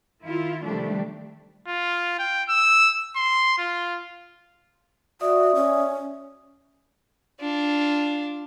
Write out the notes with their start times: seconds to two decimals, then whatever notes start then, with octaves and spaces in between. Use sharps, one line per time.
0.22 D#3 E4 F4
0.65 C3 D#3 F3 G3 A3 D4
1.68 F4
2.19 G5
2.49 E6
3.16 C6
3.58 F4
5.21 F#4 D5 E5 D#6
5.55 C#4
7.40 D4 F4